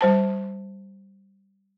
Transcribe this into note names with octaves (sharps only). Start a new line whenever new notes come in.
G3 C5 A5